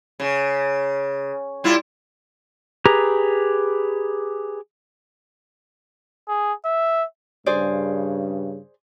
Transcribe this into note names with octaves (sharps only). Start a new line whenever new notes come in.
C#3
G3 E4 F4
G4 G#4 B4 A#5
G#4
E5
G2 C#3 G#4 C5 D5